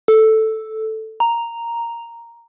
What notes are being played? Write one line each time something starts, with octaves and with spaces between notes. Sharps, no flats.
A4
A#5